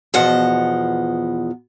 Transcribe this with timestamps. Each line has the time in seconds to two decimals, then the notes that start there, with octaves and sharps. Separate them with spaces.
0.14 E2 B2 F3 D#5 F#5